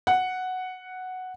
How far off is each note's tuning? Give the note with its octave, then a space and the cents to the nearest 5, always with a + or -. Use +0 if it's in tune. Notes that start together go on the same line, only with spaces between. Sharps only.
F#5 +0